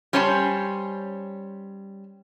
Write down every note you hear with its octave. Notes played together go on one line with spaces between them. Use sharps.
G3 C#4 C5 C#5 G#5 A5